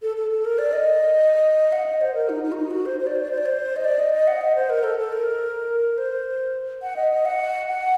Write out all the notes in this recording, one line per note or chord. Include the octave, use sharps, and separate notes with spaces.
A4
A4
A4
A#4
D5
D#5
F#5
D#5
C5
A#4
D#4
D#4
F#4
D#4
F#4
C5
C5
D5
C5
D5
C5
D5
C5
D#5
D5
D#5
D#5
F#5
D#5
C5
A#4
A4
A4
A#4
C5
F#5
D#5
D#5
F#5
F#5